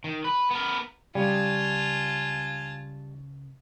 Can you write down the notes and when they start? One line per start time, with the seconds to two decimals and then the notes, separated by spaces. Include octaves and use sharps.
0.04 D#3
0.24 B4
0.51 B3 A#4
1.15 C#2 C#3 G3 F4 G#5 A5